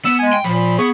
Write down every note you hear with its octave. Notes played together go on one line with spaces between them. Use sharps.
B3 E6
G#3 G#5
G5
A#2 F3 B5
B3 G#4 B5 C#6